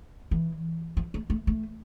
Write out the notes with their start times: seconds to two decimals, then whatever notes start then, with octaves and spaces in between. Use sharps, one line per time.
0.31 E3
0.97 F3
1.14 A3
1.30 A3
1.47 A3